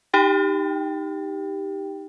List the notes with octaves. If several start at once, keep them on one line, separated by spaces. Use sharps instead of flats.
D#4 G4 G5